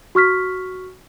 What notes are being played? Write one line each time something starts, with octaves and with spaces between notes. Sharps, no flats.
F#4 C#6 F6 B6